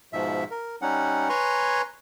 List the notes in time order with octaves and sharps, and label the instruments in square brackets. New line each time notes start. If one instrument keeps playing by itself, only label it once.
[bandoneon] G#2 B2 F3 E5
A#4
G3 C#4 D#4 F#5
B4 C#5 G#5 A#5 C6 C#6